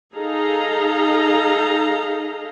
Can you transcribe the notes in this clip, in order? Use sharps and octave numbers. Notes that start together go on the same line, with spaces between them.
D#4 G#4 A4 F5 A#5